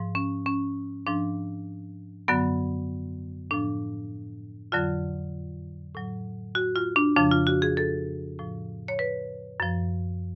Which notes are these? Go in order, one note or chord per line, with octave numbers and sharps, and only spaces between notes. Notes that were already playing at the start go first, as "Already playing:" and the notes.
Already playing: G#2 F3
C#4
C#4
G#2 F3 D4
F#2 D3 F#3 B3
A2 F3 D4
F2 D3 F#3 F4
A2 F#3
F#4
F4
D4
F2 C#3 F3 D4
F4
F#4
G#4
A4
A2 F3
C#5
B4
F#2 F3